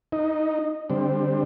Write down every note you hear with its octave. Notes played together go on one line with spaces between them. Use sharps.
D#4
D3 G3 C4